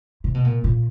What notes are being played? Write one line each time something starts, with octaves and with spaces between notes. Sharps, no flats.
C3
B2
A#2
A#2